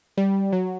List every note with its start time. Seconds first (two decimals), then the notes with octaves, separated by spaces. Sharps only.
0.17 G3
0.53 F#3